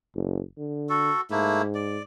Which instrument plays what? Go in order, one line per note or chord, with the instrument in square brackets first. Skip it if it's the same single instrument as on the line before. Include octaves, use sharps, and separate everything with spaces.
[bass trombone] F#1
D3
[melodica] F#4 A4
[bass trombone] G#2 [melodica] A3 A#3 E4
[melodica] D5